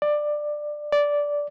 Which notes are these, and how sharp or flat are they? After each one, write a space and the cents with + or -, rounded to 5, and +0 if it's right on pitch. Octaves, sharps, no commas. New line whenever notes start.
D5 +15
D5 -10